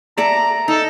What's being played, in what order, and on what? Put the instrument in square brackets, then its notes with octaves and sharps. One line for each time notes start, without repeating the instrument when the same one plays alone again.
[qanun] A4 D5 E5 [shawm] A#5
[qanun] D#4 [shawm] A4